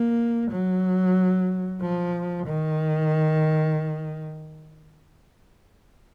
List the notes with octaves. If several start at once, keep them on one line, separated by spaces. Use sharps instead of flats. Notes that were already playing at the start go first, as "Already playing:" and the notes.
Already playing: A#3
F#3
F3
D#3